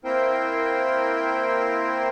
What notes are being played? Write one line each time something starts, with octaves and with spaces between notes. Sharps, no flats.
A#3 C4 E4 A#4 C5 G5